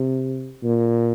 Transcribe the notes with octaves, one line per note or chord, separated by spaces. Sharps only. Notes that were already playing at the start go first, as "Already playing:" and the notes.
Already playing: C3
A#2